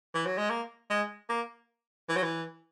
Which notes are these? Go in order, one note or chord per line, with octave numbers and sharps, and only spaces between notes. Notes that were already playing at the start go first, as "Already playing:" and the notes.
E3
F#3
G#3
A#3
G#3
A#3
E3
F#3
E3